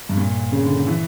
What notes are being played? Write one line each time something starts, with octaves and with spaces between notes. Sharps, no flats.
G2
A#2
C#3
D3
D3
E3